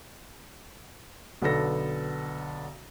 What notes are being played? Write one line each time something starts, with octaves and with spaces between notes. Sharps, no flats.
B1 D3 B3 A4 A#6